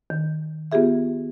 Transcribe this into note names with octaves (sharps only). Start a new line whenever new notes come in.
D#3
B3 F4 G4 G#4 E5